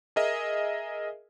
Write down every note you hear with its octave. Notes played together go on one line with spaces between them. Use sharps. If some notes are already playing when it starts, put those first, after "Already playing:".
G#4 A#4 D#5 E5